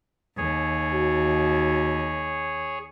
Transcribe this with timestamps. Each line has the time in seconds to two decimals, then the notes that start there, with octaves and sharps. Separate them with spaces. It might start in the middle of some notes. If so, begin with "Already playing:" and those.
0.37 D#2 G#4 C#5
0.94 F#4